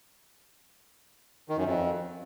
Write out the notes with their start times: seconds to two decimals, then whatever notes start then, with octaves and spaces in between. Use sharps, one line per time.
1.49 D#3
1.57 F#2
1.66 F2